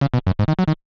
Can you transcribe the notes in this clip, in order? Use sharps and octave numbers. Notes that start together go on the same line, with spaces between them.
C#3
B2
F#2
G#2
D#3
F#3
D#3